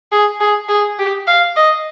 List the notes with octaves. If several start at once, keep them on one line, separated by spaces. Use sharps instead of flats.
G#4
G#4
G#4
G4
F5
D#5